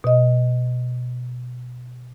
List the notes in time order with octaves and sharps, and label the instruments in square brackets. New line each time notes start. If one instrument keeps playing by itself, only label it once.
[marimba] B2 D#5